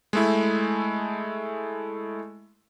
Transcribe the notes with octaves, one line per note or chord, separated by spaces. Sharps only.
G#3 A3 E4